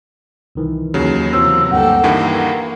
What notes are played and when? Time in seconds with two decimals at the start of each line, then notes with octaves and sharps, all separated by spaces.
0.55 C2 D#3 E3
0.94 D#2 C#3 F#3
1.33 C3 E3 F#3 C4 F4 C5 E6
1.71 D2 G2 A#3 G4 A4 F#5
2.04 G2 D#3 E3 A#3 G5
2.38 F#5